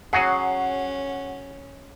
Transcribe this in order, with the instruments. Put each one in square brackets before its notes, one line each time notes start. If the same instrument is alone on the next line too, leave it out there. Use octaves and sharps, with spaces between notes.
[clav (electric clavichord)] F#3 F#4 G#4 [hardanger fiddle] C#4 [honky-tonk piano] F#5 C7